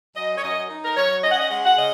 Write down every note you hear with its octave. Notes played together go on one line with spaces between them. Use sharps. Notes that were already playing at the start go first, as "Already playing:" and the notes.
F#2 D#5
C#5
F#2 D#5
D#4
A#4
F#3 C#5
C#4 D#5
F#5
D#5
G#3 F#5
F#5
C#3 D#5